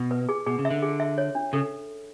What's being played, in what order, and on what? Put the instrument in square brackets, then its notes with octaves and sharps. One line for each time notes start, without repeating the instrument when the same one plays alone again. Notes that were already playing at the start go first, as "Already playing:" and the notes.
Already playing: [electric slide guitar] B2
[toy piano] B4
G#4
[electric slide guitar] B2 [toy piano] G#4
[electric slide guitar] C#3
[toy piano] E5
[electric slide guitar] D3
[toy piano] G#4
E5
C#5
D4
[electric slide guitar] C#3 [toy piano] A4